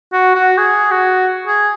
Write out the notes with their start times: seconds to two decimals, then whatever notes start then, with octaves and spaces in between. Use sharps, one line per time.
0.13 F#4
0.35 F#4
0.58 G#4
0.91 F#4
1.47 G#4